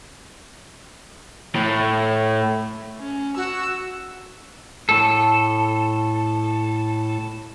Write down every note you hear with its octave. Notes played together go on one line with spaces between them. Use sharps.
A2
C#4
F#4 E6
A2 A4